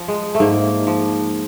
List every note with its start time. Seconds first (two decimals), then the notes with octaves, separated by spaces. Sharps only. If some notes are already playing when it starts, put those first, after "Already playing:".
Already playing: F3
0.08 G#3
0.35 A3
0.40 G#2 A#3
0.87 F3